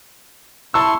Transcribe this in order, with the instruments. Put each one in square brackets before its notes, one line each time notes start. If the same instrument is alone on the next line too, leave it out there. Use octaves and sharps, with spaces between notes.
[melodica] E4 C6 C#6 [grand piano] A5 E6